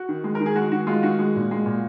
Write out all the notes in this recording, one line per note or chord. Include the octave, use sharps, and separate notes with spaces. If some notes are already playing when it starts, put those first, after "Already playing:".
Already playing: F#4
D#3
G#3
A#4
D#3
G#4
G#3 F#4
D#3 F#4
G#3 F4
D#3 F#4
G#3
A#2
G#3
A#2